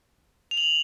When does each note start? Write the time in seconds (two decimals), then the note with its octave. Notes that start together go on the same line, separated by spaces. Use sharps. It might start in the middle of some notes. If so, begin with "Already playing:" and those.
0.51 F7
0.57 F#7